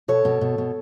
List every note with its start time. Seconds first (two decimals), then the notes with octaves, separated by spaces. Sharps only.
0.08 B2 A4 C#5
0.25 B2
0.41 B2
0.58 B2